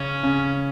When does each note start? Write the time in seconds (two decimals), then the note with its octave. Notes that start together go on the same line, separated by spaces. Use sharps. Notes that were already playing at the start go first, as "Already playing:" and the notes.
Already playing: C#3 C#4
0.23 C#3